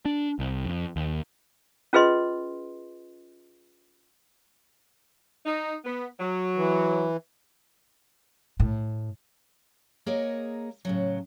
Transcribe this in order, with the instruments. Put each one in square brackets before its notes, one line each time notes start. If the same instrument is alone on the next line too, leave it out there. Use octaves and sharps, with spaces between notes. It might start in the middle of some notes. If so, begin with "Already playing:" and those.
[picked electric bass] D4
C2
F2
D#2
[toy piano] C#4 F4 G#4 B4 D#5 C6
[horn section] D#4
B3
F#3
[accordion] E3
[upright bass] A2
[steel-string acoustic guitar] A#3 G#4 A#4 C#5 D#5
A2 C#3 F#3